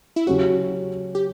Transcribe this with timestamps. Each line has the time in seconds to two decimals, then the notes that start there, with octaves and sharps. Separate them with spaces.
0.16 E4
0.27 C#3 F#3 C#4 F#4 G4
1.15 G4